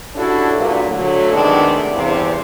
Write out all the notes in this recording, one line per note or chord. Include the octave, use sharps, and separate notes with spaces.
C#4 D4 E4 F#4 G4 A4
G2 A#2 F#3
D3 F#3 A3
C3 D#3 G#3 A3 B3 D4
E2 G2 C3